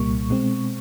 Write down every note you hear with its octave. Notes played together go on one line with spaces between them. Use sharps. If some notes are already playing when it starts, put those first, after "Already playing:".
Already playing: C2 A#2 G3 A#3 C#6
B2 G#3 C4